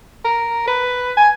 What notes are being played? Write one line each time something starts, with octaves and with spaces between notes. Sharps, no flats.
A#4
B4
G#5